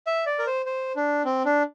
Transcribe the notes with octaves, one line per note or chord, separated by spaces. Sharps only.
E5
D5
A#4
C5
C5
D4
C4
D4